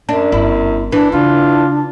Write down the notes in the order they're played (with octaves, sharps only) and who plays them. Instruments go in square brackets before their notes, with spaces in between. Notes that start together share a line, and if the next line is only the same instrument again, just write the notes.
[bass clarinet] F#2 [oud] D4
[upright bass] G1 [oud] E4
[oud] E3 [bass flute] D4
[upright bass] C#3 [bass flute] D4 [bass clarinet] F4